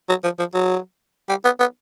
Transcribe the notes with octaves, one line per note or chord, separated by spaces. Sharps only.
F#3
F3
F3
F#3
G3
B3
B3